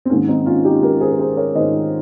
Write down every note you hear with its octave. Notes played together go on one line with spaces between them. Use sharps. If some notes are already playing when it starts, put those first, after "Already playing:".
C4
G#2 D#3 A#3 C#4
C4 D#4
C#4 F4
D#4 G4
G#2 D#3 G4 A#4
G#4 C5
A#4
G#4 C5
A#4 C#5
G#2 D#3 C5 D#5